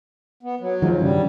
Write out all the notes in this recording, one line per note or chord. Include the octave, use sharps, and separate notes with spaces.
B3
F#3
D#3 F3 G#3
G2 C#3 G3